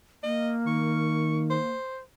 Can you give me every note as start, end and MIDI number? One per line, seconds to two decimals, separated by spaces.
0.23 1.71 58
0.23 0.53 75
0.67 1.59 51
0.67 1.40 85
1.50 2.00 72